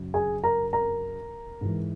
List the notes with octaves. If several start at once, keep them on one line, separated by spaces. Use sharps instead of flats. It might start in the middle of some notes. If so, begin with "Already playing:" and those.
Already playing: F#2 C#3 F#3
G#4 G#5
A#4 A#5
A#4 A#5
G#2 E3